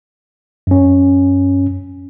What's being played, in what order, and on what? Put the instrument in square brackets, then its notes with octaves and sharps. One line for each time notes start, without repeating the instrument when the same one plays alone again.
[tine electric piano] F#2 C#4